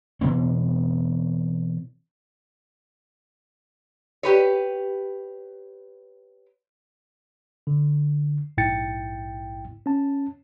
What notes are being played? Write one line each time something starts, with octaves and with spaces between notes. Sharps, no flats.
B2 E3 B3 C4
G4 B4 C#5
D3
A#1 G#2 E4 G5 A6 C#7
C#4 A5